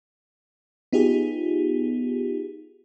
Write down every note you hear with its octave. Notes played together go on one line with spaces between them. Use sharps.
B3 D#4 F4 G4 G#4